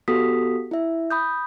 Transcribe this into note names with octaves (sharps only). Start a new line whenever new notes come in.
B3 F#4 G4 A4 D#6 B6
E4 E5
B5 D#6 G6